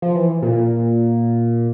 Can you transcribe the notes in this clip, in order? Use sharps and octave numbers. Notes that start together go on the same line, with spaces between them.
F3
E3
A#2